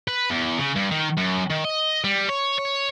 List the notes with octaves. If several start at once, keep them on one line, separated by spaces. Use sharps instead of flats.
B4
E2
C#3
G2
D#3
F#2
D#3
D#5
G3
C#5
C#5